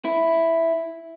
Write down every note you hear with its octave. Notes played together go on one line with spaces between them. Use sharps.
E4